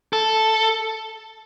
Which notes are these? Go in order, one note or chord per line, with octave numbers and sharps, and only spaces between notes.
A4